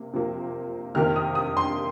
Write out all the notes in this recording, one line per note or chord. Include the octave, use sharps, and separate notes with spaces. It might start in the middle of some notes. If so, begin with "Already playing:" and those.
Already playing: C3 A#3
C3 F3 A#3
F2 C3 D#3 A#3 F6
D#6
D#6
C6